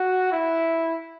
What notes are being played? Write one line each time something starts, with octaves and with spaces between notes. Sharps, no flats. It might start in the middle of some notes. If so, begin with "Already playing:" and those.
Already playing: F#4
E4